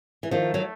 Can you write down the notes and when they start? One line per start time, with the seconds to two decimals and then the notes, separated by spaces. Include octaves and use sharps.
0.23 E3
0.31 D#3 F3 A3
0.54 F#3